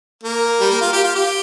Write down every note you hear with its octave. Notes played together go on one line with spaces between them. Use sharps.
A#3
G3
A#3
F4
G4
F4
G4